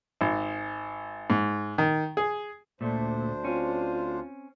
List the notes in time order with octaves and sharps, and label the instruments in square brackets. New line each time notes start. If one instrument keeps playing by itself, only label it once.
[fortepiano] G#1
G#2
D#3
G#4
[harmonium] D2 D4 C5 [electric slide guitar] A#2 A3
[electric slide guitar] C4 C#4 [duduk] F4